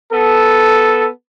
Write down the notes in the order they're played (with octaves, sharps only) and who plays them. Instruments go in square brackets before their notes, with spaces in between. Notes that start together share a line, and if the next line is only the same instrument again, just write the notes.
[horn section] B3 A4